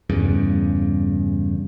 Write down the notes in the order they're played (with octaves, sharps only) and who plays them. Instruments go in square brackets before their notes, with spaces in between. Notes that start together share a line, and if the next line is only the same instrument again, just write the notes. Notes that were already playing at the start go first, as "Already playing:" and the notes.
[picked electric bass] E2 G2 C#3